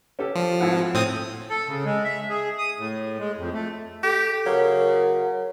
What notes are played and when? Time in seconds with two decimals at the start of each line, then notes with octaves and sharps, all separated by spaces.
0.19 C#4 G4 A4
0.35 F3
0.61 G#1 E4 F#5
0.94 A2 C4 D#6
1.50 A4
1.68 C#3
1.85 G#3
2.04 E5
2.30 G#4
2.58 D#6
2.78 A2
3.19 G#3
3.37 F2
3.53 A3
4.03 G4 A4
4.46 C#3 F#3 A#4